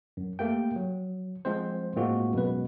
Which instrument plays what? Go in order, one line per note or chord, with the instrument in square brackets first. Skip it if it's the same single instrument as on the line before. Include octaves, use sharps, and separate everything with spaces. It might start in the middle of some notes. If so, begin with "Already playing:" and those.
[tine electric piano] F#2
A3 A#3 G4 G5
F#3
F3 G#3 C4 C5
A2 G#3 A#3 C4 F4 F#4
F#2 B2 G#3 B4